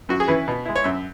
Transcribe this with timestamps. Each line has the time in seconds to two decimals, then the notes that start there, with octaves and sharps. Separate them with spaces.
0.09 F#2 F#4
0.20 G#4
0.28 E3 C#4 E4 B4
0.48 B2
0.66 G#3 E4
0.76 C#5
0.84 F#2 E5